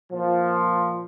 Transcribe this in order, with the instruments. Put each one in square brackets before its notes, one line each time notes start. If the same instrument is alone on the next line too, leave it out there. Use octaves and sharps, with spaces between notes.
[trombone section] A#2 F3